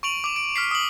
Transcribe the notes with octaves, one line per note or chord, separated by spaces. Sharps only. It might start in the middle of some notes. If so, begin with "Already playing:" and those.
C#6 D7 F7 F#7
D6 F7
D7
F6 B6 C7
D#6 F#7